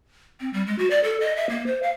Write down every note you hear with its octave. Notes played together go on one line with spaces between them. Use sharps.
C4
G3
G#3
F#4
D5
A4
D#5
E5
A#3
C5
F5